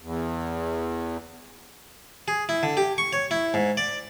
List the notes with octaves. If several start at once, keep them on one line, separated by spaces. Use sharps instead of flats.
E2
G#4
E4
D3
G4
C#6
C#5
E4
G#2
D5